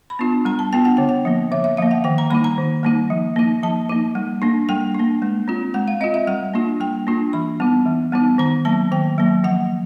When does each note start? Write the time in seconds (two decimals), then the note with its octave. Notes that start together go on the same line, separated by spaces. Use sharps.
0.10 B5
0.19 B3 D4 F4
0.45 G3 A#5
0.59 A5
0.73 B3 D4 F4 G5
0.85 F#5
0.97 D3 G5
1.09 F#5
1.25 F3 A#3
1.52 D3 E5
1.64 E5
1.77 F3 A#3 F5
1.91 F#5
2.04 D#3 G5
2.18 A#5
2.30 G3 A#3 D#4 B5
2.44 A#5
2.58 D#3
2.83 G3 A#3 D#4
3.10 F3
3.36 A#3 D#4
3.63 F3 A5
3.89 A#3 D#4
4.15 G3
4.42 A#3 D4
4.69 G3 G5
4.95 A#3 D4
5.22 G#3
5.48 C4 F4
5.74 G#3 F#5
5.88 F5
6.00 C4 F4 D#5
6.14 E5
6.27 G3 F#5
6.54 A#3 D4 F4
6.80 G3 G5
7.07 A#3 D4 F4
7.33 E3 B5
7.60 G3 B3 D#4
7.86 E3
8.12 G3 B3 D#4
8.38 D#3 A#5
8.65 F#3 A#3 A5
8.92 D#3 G5
9.18 F#3 A#3
9.44 F3 F#5